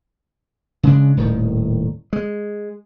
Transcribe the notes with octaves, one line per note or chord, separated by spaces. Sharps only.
C#3 G#3 D4
D#1 A2 D#3
G#3